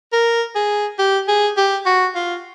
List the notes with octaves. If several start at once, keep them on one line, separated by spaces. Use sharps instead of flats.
A#4
G#4
G4
G#4
G4
F#4
F4